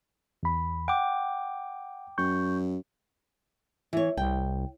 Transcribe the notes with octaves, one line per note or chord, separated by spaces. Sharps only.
E2 B5
F#5 G5 D6
F#2 C#6 G6
E3 C#5
C2 G5